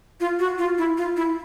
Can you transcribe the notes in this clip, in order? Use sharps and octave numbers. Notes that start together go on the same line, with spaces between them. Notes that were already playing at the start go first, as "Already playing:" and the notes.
F4
F#4
F4
E4
F4
E4